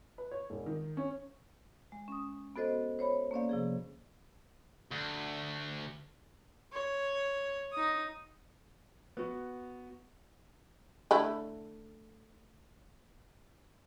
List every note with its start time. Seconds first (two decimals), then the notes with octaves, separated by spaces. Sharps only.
0.18 B4
0.31 C#5
0.50 E1
0.66 D#3
0.97 C#4
1.92 G#3
2.08 C#4 D#6
2.56 B3 F#4 A4 C5 D#5
2.99 C5 C#5 B5
3.31 A#3 C#4 D5 F5
3.49 C3 F3 G#4
4.92 D2
6.72 C#5
7.72 D#4 D#6
9.17 B3 F#4
11.11 D3 A3 E4